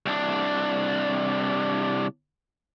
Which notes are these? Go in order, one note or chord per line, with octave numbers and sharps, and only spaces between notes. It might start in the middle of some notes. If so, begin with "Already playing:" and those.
C2 D4